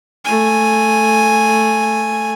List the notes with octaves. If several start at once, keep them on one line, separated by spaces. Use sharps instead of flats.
A3 G#5